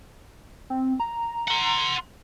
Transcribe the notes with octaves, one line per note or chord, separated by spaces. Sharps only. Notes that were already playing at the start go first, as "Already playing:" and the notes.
C4
A#5
F#5 C6